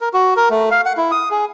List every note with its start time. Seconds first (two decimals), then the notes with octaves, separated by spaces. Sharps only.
0.01 A#4
0.13 F#4
0.37 A#4
0.50 A3
0.71 F5
0.86 F#5
0.97 E4
1.11 D#6
1.31 G#4